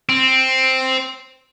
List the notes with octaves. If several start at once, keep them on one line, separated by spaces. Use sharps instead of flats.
C4